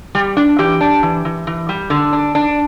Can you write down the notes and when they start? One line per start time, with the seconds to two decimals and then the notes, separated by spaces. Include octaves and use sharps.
0.15 G3
0.37 D4
0.59 E3 G4
0.81 D4
1.03 E3
1.25 E3
1.47 E3
1.69 G3
1.90 D3
2.13 D4
2.35 D4